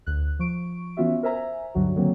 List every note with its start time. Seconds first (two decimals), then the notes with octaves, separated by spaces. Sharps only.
0.06 D2 F#6
0.39 F3 C#6 D7
0.97 E3 B3 C#4 F4 F#4 E5
1.23 A#4 C5 E5 G#5 A#5
1.75 C#2 G2 D3 F#3 G3 F#4
1.95 D3 D#3 F#3 A#3 C4